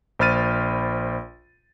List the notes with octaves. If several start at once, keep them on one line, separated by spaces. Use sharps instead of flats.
A#1 C5 B5 F6 A6 D#7